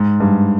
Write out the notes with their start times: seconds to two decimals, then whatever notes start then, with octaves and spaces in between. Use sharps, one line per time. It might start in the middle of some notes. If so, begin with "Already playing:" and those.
Already playing: G#2
0.20 G2